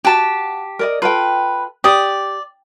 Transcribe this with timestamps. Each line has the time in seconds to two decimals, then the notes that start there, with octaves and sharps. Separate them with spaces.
0.05 F#4 G4 A5
0.79 A#4 D5 D#5
1.02 F4 A4 B4 G5
1.84 G4 D5 D#6